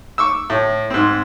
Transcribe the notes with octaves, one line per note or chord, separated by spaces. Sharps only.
C#6 D6 E6
A2
G#2 C4